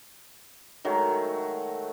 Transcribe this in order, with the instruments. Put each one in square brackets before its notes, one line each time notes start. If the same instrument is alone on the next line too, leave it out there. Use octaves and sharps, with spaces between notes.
[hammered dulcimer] D#3 F#3 G#3 A3